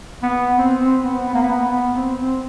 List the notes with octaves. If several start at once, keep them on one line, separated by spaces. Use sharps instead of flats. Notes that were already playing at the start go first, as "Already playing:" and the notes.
B3
C4
C4
B3
B3
A#3
B3
B3
C4
C4